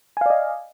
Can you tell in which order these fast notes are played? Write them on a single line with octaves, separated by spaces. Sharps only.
G#5 F5 D5 D#5